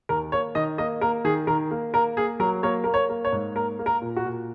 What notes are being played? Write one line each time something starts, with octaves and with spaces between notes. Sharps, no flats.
D#2 A#4
A#3 C#5
D#3 D#5
A#3 D#5
A#3 A#4
D#3 G#4
D#3 A#4
A#3
A#3 A#4
A#3 G#4
F#3 A#4
A#3 C#5
A#3 A#4
C#5
A#3
C#5
G#2
A#3 A#4
A#3
A#4
A#2
F#4
A#2